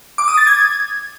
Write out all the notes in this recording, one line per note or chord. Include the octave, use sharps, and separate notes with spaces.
D6
D#6
A6
G#6